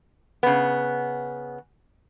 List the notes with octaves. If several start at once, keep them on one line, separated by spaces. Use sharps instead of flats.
C#3 B3